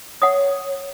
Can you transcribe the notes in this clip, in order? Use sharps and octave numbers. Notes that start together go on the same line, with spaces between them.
C#5 F#5 D#6